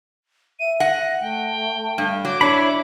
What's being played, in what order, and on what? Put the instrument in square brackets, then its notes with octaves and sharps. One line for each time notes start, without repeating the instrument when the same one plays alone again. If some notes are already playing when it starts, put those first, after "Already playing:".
[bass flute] E5 [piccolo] D#7
[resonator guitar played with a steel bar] F#5 [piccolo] A#6
[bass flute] A3 [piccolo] G5
[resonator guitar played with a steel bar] G2
[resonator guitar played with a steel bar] F#3 [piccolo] D6
[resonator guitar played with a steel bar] D4 [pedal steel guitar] E4 C#5 B5